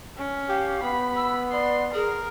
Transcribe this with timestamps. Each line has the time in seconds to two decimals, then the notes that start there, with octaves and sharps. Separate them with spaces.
0.17 C#4
0.49 G4 F5
0.83 B3 B5
1.16 E6
1.51 D5 C6
1.94 G#4 A#4